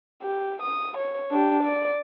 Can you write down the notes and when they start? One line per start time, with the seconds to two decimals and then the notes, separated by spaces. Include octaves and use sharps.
0.23 G4
0.62 D#6
0.97 C#5
1.31 D4 G4
1.63 D5